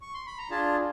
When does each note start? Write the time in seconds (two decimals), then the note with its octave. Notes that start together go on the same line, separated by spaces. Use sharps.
0.02 C#6
0.14 C6
0.26 B5
0.38 A#5
0.50 D4 F4 G#4 A5